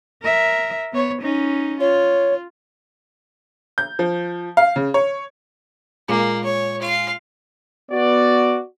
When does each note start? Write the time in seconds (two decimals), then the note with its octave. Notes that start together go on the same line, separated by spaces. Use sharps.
0.23 A#4 E5
0.92 B3 C#5
1.22 C#4 D#4
1.80 F4 C#5
3.78 G6
3.99 F3
4.57 F5
4.76 C#3
4.94 C#5
6.09 A#2 G#3 A#3 D6
6.44 C#5
6.80 F4 F5
7.92 B3 F#4 D5